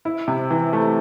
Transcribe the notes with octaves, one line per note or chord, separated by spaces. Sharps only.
E4
C3
E3
A3